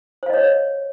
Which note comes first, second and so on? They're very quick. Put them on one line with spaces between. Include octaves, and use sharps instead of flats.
C5 F5 D#5 C#5